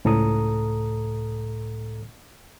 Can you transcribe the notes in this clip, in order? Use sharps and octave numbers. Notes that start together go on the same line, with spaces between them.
C#2 A2 A4 A#5 D#6